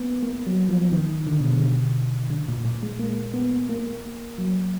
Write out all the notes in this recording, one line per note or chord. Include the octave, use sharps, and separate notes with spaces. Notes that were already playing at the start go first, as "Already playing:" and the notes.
Already playing: A#3 B3
A#3
F#3
F3
D#3
D3
B2
D3
D3
A#2
A#2
G#3
A#3
B3
A#3
F#3